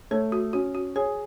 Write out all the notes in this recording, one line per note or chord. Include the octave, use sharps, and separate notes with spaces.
A3 C#5
F#4
C#4 F#4
F#4
G#4 C#5